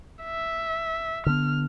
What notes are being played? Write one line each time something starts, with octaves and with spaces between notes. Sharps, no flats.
E5
D3 B3 F6